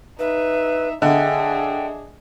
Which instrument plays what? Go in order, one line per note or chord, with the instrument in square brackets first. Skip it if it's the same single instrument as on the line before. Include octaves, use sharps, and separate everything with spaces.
[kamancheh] D#4 E5 [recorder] B4
[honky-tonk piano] D3 [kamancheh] D4 G#4 [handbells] D#5 E5 F#5 [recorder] G5